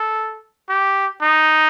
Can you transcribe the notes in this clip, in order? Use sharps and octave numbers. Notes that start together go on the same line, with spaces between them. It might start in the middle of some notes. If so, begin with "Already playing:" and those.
Already playing: A4
G4
D#4